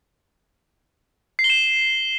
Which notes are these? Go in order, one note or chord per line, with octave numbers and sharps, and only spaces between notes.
C7
G7
E7